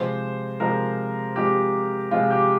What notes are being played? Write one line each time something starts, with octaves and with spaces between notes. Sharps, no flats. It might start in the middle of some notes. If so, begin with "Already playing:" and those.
Already playing: C3 F3 G#3 C5
C3 F3 G#3 A#4
C3 F3 G#3 G4
C3 F3 G#3 F4
G4